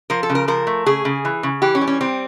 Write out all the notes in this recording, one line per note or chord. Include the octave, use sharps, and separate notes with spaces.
F3 A#4
A4
C#3
A#4
F3 A#4
A3
C#3 G#4
C#3
E3
C#3
E3 G4
C#4
G3
C#4
G3 C4